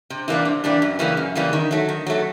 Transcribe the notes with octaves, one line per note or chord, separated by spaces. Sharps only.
C3
E3 G3 A#3 D4
C3
E3 G3 A#3 D4
F#2
C#3 E3 G3 A#3
F#2
C#3 E3 G3 A#3
D#3
F#3 A3
D#3
F#3 A3